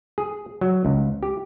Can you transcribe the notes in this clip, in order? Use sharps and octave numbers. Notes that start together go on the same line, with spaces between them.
G#4
F#3
C#2
G4